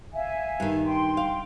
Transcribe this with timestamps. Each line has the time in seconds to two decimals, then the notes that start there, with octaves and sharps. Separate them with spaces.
0.13 E5 F5 G#5
0.60 G2 D#3
0.85 G5 C6
1.17 F5